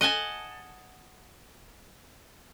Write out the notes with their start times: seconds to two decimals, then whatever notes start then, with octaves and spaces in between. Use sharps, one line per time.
0.01 D#5 F#5 G#5 A5